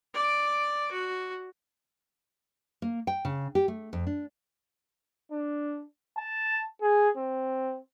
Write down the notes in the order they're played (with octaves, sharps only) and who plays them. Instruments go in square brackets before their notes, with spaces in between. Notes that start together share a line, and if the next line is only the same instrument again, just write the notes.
[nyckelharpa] D5 D6
F#4
[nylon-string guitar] A#3
G5
C#3
G4
A3
F2
D4
[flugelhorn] D4
A5
G#4
C4